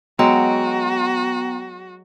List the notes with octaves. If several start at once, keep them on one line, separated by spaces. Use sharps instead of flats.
F#3 G#3 B3 F#4 G5 A#5